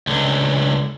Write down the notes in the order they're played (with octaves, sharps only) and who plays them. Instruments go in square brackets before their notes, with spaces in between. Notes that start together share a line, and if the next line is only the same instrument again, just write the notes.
[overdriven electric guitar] C#2 D3